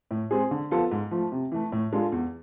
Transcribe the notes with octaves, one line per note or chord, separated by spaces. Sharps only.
A2
G#3 C4 G#4
D3
F3 B3 F4 A4
G#2
F3 A3
C3
E3 A3
A2
G#3 D4 F4 A4
E2